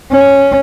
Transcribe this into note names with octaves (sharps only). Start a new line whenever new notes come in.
C#4